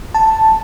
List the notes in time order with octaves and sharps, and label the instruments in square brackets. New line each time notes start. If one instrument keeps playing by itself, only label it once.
[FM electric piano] A5